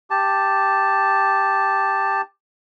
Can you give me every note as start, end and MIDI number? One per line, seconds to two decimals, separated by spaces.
0.10 2.21 67
0.10 2.21 81